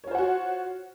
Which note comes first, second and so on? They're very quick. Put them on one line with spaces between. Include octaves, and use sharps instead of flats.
C#5 F4 C5 F#5 F#4